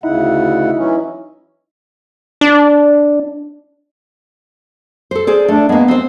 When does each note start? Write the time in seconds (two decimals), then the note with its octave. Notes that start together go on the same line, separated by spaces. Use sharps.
0.03 D2 C#3 D#4 E4 F#5
0.77 E3 F#3 C#4
2.41 D4
5.11 A4 C5
5.27 G#4 C5 D5
5.48 A3 D4
5.69 G#3 A#3 B3
5.88 C4 C5